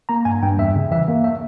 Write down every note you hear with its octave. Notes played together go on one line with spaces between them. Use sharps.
A#3 A#5
G2 G#5
G2 G5
E2 E5
C#3
E3 E5
A#3
E5